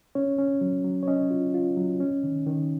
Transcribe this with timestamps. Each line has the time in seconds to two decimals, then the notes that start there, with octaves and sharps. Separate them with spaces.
0.15 C#4 C#5
0.39 C#4
0.61 F#3
0.84 F#3
1.03 C#5
1.08 C#4 D#5
1.31 F4
1.54 F4
1.77 F#3
2.00 C#4
2.23 D#3
2.46 D#3